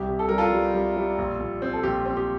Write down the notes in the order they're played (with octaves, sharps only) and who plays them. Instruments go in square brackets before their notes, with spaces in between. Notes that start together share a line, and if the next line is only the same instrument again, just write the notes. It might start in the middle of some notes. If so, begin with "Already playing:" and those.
Already playing: [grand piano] C2 G4
C3
A4
G3 A#4
F4 A4
G3
G3
G3
A#1
A#1
C4
A4
A#1 G4
C4
G4